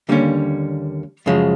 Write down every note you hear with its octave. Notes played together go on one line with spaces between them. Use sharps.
D#2 D3 G3 A#3 C#4
F#2 C#3 F3 G#3